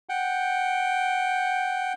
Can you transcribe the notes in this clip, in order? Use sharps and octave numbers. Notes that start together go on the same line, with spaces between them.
F#5 G5